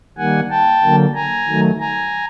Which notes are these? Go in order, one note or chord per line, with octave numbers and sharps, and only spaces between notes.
D#3 G3 A#3 F#5 G#5
G5 A5
D3 F#3 A#3
G#5 A#5
D#3 F#3 A3
G#5 A#5